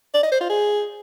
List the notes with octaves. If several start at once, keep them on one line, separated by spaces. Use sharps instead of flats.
D5
D#5
C5
F4
G#4